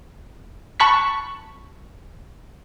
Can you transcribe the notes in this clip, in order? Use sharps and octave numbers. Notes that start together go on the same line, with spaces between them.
A5 B5 C#6 F#6 B6